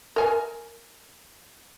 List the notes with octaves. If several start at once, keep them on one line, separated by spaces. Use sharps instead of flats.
A#4 G#5